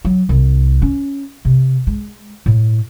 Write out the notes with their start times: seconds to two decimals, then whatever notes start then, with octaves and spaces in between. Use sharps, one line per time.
0.05 F#3
0.29 C2
0.82 C#4
1.45 C3
1.87 G#3
2.46 A2